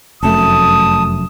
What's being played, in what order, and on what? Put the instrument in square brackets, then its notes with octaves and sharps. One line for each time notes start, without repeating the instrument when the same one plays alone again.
[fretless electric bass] F1 F#2 A3 [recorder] A5 [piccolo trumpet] D#6